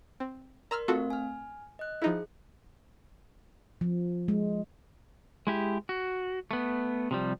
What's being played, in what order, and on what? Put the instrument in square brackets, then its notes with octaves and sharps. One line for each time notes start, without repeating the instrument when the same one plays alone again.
[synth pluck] C4
[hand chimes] A#4 D5 C6 [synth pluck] A#5 E6 F6
[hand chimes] A3 C4 F5 [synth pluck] F4 F#4 A4
[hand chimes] G#5 F6
D#5 F#6
[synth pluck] F3 D#4 E4 [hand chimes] G#4
[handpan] F3
G#3
[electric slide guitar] G#3 E4 G4
F#4
A3 B3
C3 F3 G3